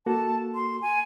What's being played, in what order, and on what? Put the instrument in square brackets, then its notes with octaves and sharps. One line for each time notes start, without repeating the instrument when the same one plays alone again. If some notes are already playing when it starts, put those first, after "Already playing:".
[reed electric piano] A#3 F#4 A4 [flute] A5
[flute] C6
G#5